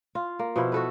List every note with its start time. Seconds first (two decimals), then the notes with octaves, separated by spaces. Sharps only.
0.15 F4
0.39 A#3
0.56 B2 F3 E4
0.72 F#4 A4 B4